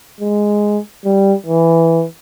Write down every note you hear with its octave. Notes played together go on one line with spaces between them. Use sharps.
G#3
G3
E3